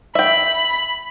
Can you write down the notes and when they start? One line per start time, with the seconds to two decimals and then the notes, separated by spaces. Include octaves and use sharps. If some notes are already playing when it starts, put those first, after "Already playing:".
0.15 E5 G5 B5